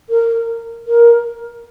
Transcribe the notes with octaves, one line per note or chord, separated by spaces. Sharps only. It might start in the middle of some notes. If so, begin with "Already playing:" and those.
A#4
A#4